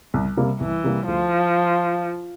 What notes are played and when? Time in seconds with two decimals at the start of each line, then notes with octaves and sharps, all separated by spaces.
0.14 C2
0.37 C3 G3 A#3
0.60 C2 E3
0.84 C3 G3 A#3
1.07 D2 F3